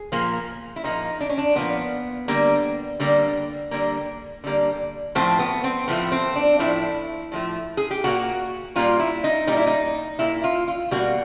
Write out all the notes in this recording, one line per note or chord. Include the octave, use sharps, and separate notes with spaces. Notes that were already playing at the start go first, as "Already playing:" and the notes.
Already playing: G#4
A#2 F3 A#3
E4
A#2 F3 A#3 D#4
D4
C#4
D4
A#2 F3 A#3 B3
D3 G3 A#3
D3 G3 A#3
D3 G3 A#3
D3 G3 A#3
A2 F3 A3 C4
B3
C4
A2 F3 A3 B3
C4
D4
A2 F3 A3 E4
A2 F3 A3
G#4
G4
A#2 G3 A#3 F#4
A#2 G3 A#3 F4
E4
D#4
A#2 G3 A#3 D#4
E4
D#4
A#2 G3 A#3 E4
F4
F4
B2 G3 A#3 F#4